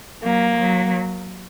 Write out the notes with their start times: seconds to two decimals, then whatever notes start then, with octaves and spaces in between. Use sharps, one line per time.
0.23 F#3 A#3
0.60 F#3